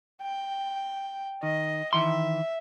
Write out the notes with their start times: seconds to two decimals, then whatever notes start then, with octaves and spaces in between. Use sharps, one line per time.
0.22 G5
1.43 D#3 D#5
1.93 D#3 E3 E5 C6